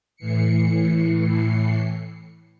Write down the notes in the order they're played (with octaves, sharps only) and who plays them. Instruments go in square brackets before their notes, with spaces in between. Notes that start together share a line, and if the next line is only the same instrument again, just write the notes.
[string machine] A2 E3 C7 C#7